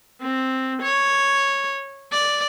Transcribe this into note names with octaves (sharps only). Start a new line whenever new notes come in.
C4
C#5
D5